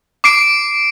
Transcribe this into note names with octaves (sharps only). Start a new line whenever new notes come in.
D6 C7 D7